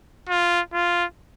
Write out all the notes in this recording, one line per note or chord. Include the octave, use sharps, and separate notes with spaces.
F4
F4